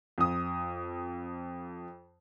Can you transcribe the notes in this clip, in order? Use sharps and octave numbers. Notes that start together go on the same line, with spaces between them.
F2 D#6